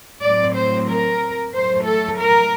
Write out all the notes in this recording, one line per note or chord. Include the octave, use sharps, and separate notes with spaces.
A2 F#3 C4 D5
C5
A#4
A2 F#3 A3 C5
A4
A#4